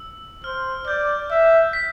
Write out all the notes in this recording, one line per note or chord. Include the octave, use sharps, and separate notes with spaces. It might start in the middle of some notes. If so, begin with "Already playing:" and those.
Already playing: E6
C5 F6
D5 G6
E5
B6